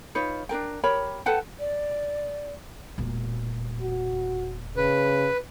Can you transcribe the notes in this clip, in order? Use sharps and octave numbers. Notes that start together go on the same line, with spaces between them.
D#4 F4 B4 C#5
D4 F4 A#4 G5
G4 A#4 C#5 B5
A4 B4 F#5 G5
D5
E1 A#2
F#4
C#3 B4